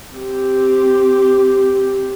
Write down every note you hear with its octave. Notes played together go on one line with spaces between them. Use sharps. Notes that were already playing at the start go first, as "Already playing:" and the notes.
C4 G4